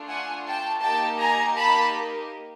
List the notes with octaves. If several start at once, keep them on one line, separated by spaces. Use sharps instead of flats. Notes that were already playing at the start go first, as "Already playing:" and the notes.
Already playing: A3 D4 F4
F#5 G#5
G5 A5
A#3 D#4 G4 G5 A5
G#5 A#5
A5 B5